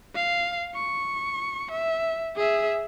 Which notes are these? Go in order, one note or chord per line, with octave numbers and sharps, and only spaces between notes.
F5
C#6
E5
G#4 E5